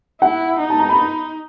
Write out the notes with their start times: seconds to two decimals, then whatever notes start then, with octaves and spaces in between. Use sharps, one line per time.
0.22 E4 F#5
0.60 D#4
0.70 A5
0.79 A#5
0.89 B5